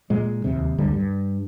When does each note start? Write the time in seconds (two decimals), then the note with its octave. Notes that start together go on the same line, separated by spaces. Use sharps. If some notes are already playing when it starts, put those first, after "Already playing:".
0.10 A#2 G#3
0.44 D1 D#2 C3
0.78 F#1 D2 D3 G3
0.93 G2